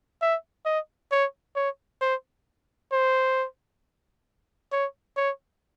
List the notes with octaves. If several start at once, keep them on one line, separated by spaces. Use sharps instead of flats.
E5
D#5
C#5
C#5
C5
C5
C#5
C#5